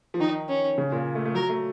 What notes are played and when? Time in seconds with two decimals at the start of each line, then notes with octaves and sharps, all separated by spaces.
0.14 F3
0.20 D#3 D#4
0.49 C#4
0.78 C#3
0.92 A#2
1.15 A3
1.26 A3
1.34 F#3 A#4
1.49 A3